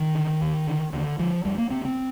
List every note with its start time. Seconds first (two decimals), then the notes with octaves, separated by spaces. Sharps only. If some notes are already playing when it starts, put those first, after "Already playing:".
Already playing: D#3
0.15 D3
0.41 D#2
0.67 D3
0.93 D#2 D3
1.19 D3 F3
1.45 F2 G3
1.58 A#3
1.70 C3 C4
1.85 C4